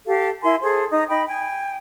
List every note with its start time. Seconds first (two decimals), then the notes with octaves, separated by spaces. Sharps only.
0.07 G4 A4 F5
0.43 E4 A#4 G#5 C6
0.62 G#4 A4 C5
0.90 D#4 A#5 D#6
1.09 D#4 G5 B5
1.27 G5 G#5